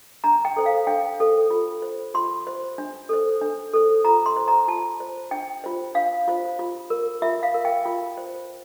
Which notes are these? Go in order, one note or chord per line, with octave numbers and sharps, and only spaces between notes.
D4 A#5
G5
A4 C5
F5
D4 G5
A4 C5
F4
C5
F4 C6
C5
D4
A4 C5
D4
A4 C5
F4 A#5
C6
C5
A#5
F4 A5
C5
D4 G5
F4 C5
D4 F5
F4 C5
F4
A#4
F4 E5
F5
A#4
G5
F4
C5